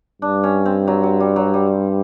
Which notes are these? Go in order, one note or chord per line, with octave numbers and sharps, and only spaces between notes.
G2 D4
C#4
C4
F#3
F#3
G3
F#3
G3